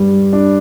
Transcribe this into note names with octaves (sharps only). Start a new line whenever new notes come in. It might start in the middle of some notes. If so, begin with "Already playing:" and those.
Already playing: G2 G3
D4